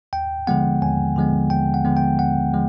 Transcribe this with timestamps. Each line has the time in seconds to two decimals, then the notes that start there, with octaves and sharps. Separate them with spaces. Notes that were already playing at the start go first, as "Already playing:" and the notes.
0.13 D#2 G5
0.47 D3 F3 G#3 B3 F#5
0.82 D#2 G#5
1.16 D3 F3 G#3 B3
1.50 D#2 G5
1.74 F#5
1.85 D3 F3 G#3 B3
1.97 G5
2.19 D#2 F#5
2.54 D3 F3 G#3